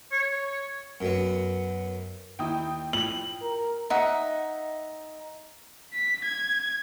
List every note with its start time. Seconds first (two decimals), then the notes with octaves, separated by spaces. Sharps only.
0.12 C#5
1.01 F#2 B3
2.39 D#2 E4 G5 D#6
2.93 A2 F3 F#7
3.42 A#4
3.90 D#4 E5 F#5
5.93 B6
6.24 G#6